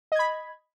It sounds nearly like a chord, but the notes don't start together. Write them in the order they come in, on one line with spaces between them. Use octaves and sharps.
D#5 G#6 B5